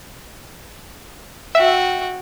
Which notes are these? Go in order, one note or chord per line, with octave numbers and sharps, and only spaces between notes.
F#4 E5 G5